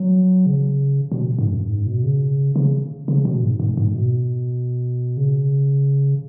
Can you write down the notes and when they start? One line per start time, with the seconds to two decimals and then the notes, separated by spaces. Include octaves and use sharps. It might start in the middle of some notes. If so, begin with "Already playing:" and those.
Already playing: F#3
0.46 C#3
1.12 B2
1.39 G#2
1.51 F#2
1.69 G#2
1.86 B2
2.04 C#3
2.56 C#3
3.08 C#3
3.25 B2
3.43 G#2
3.60 G#2
3.77 G#2
3.95 B2
5.17 C#3